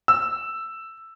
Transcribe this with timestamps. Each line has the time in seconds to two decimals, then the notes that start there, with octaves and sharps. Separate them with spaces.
0.08 E6